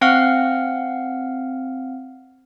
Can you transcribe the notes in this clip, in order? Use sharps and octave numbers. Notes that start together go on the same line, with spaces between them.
C4 F5 F#5 F6